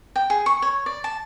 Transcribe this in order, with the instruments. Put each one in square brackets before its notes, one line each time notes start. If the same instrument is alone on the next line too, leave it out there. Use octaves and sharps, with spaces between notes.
[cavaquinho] G5
G#4
C#6
C#5
D5
A5